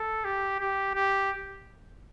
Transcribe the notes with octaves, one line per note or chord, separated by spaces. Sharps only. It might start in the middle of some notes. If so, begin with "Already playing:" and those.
Already playing: A4
G4
G4
G4